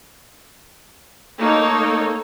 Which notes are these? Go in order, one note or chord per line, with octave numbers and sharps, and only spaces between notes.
A3 A#3 D#4 A4 C#5